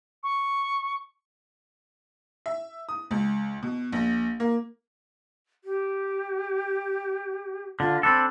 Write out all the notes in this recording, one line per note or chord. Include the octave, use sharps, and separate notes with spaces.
C#6
E5
D#6
C#2
B2
A#1
A#3
G4
D3 F4
C4 D4 A4 B5